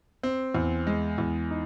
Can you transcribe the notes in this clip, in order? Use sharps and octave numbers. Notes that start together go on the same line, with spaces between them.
C4
E2
G#3
E2
D#4